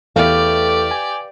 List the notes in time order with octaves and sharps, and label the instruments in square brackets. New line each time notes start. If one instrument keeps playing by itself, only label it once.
[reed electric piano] E2 E4 F6 [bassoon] A3 [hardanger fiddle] G4 D5 [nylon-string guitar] B4 F5
[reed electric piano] G#5